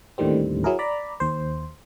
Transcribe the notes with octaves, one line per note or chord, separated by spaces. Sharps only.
D#2 A2 D3 D#3 G3 C4
F#3 E4 G#4 A#4
D5 A#5 B5
D#2 C5